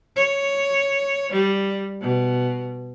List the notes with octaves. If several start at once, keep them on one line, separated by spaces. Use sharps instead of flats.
C#5
G3
B2